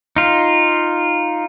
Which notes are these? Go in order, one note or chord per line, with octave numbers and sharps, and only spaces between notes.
D#4 F4